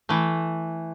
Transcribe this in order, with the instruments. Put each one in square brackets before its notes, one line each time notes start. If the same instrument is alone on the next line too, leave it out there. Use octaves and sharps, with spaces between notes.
[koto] E3 A3